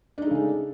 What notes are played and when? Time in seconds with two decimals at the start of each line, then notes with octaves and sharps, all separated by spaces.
0.18 D4
0.22 D#4
0.26 A3
0.31 C#3
0.35 G#3